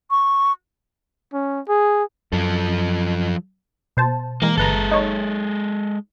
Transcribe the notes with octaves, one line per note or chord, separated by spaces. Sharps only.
C#6
C#4
G#4
F#2 F3 A4
B2 C5 A5
E3 G#3 A#3 A#4
G1 G#3 A4 B4 A#5
D#4 C#5